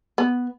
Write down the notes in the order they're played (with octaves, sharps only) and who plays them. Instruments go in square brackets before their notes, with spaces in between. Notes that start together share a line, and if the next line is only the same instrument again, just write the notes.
[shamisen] B3